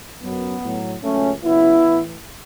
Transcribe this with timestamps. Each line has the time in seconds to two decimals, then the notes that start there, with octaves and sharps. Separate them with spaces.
0.22 F#2 F#3 B3
0.62 A2 F#3
1.02 C#2 C#3 F#3 A3 C#4
1.43 C#2 C#3 F#3 B3 E4
1.84 A2 E3